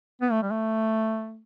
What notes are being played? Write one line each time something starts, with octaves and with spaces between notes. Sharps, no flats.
B3
A3
G3
A3